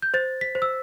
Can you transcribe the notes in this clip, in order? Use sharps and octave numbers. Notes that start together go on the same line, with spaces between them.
G6
C5 A6
B6
C5
E6